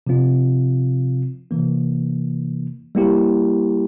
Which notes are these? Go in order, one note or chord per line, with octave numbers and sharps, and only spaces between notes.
C3 F3 C4 F4
C3 E3 A#3
G3 A#3 E4 G4